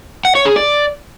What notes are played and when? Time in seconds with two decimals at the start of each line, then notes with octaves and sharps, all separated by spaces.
0.25 F#5
0.35 C#5
0.46 G#4
0.56 D5